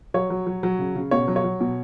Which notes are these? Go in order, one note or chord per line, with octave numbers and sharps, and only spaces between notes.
F#3 C#5
F#3
F#3
F#3
C#3
C#3
B2 C#5
F#3
C#5
F#3
B2